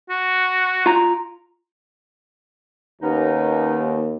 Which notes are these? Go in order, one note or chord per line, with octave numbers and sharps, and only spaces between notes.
F#4
F4 A#5
D#2 B3 C#4 D#4